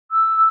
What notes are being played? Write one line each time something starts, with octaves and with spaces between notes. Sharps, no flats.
E6